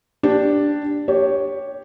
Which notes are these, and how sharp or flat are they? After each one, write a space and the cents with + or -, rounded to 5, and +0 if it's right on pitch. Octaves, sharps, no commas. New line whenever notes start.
D4 +0 G4 +0
G4 +0 C#5 +0